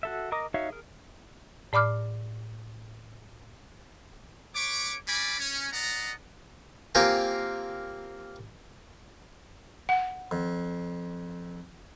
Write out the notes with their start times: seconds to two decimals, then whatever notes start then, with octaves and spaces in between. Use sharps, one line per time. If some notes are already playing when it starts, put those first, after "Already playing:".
0.03 F#4 A4 E5
0.32 A#4 D#5 A#5 D6 D#6
0.54 D#4 F#4 C#5 E5 F5
0.70 G#4 A#4
1.73 A2 D5 B5 D6 F6
4.55 B4 C#5 C#6 D6
5.07 G3 C#4 D5 G#5 B5 D6
5.39 C#4
5.72 D4 D5 D#5 F#5 A#5
6.95 A#3 C4 F4 G4 A#4 G#5
9.89 F#5
10.31 F2